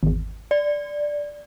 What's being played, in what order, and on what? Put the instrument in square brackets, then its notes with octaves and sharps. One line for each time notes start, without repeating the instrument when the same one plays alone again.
[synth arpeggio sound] G#1 E2
[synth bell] D5